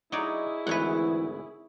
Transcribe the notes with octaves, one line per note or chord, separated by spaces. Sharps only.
F#3 D#4 E4 G#4 C#5 D5
G#1 D2 E3 B4 C#5 F#5